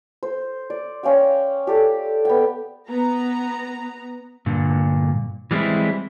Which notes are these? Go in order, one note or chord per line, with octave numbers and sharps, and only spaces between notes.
C5
D5
C#4 F5 G5
G4 A4 D5
B3 G5
B3 A#5
G2 A#2 D3
E3 G3 G#3 B3 C4 E4